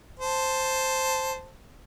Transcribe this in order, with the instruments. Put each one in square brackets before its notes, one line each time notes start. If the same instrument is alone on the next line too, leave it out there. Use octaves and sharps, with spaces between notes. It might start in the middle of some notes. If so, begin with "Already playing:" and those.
[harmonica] C5 A5